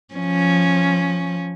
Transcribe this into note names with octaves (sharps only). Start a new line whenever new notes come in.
F3 C#4